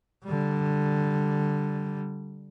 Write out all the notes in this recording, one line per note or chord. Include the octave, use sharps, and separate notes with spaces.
D3 G3